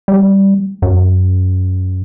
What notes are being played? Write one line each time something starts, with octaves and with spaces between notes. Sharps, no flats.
G3
F#2